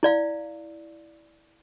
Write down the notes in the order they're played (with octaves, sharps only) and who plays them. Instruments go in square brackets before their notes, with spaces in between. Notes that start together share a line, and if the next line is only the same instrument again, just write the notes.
[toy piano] E4 D5 F5